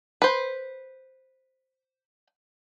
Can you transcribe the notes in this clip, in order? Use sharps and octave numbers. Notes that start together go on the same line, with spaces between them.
B4 C5